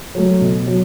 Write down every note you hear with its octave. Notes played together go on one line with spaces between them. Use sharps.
F#3 A3
B2
F#3